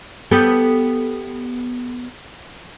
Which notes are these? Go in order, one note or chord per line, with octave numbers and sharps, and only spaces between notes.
B3 G4 A4